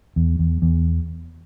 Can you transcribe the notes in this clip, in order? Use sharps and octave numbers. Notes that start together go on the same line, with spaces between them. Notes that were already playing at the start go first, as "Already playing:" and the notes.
E2
E2
E2